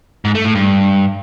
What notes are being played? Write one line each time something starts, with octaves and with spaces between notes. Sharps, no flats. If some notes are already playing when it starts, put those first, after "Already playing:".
G#2
A3
A2
G2